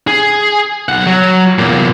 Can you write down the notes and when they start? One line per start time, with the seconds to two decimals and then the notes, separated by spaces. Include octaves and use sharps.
0.07 G#4
0.89 B1 F#5
1.07 F#3
1.59 E2 A#2